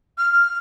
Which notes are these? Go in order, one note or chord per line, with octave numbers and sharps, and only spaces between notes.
F6